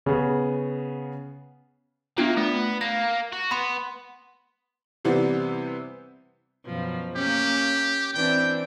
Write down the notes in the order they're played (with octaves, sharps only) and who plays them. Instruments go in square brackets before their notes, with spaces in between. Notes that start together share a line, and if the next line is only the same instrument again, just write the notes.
[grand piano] C#3 B3
[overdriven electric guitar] A#3 [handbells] B3 D4 F4
[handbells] A3 [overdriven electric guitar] B3
[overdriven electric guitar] A#3 [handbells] A#6
[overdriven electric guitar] F#4
[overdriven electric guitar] B3 [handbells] B5 C6
[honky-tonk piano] C3 E3 G3 B3 C4
[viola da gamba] F#2 B2 F3
[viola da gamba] A#3 C#4 [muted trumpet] G4
[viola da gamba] E3 C4 D4 [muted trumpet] G5